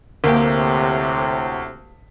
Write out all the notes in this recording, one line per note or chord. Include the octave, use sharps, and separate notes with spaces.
D2 A2 C3 A#3 G4